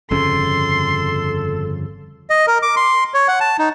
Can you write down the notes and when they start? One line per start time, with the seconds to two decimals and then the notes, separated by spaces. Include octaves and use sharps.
0.11 G1 F2 C#3 A4 C6
2.30 D#5
2.47 A#4
2.63 D6
2.76 C6
3.14 C#5
3.28 F#5
3.40 A5
3.59 D#4